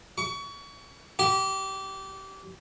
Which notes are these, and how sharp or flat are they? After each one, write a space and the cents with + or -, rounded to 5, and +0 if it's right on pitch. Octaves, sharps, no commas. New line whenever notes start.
C#6 +30
G4 -25